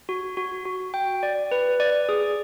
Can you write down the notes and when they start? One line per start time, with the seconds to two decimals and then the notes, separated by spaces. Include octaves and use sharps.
0.09 F#4
0.37 F#4
0.65 F#4
0.94 G5
1.23 D5
1.52 B4
1.80 D5
2.09 G#4